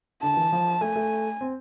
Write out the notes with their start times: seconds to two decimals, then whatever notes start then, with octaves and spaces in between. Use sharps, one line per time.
0.23 D3 A5
0.37 E3
0.52 F3
0.81 A3 G#5
0.96 A3
1.41 C4